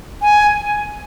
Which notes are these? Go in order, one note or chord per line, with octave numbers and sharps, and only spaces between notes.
G#5